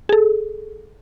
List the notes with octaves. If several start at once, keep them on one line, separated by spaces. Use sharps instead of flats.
G#4 A4